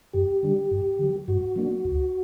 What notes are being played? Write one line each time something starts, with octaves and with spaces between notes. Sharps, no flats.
F#2 G4
D3 G3 D4
G2
D3 F#3
G2 F#4
F#3 A#3 D4
D2